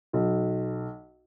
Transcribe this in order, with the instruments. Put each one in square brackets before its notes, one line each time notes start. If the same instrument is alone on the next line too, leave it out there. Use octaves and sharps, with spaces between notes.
[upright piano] B1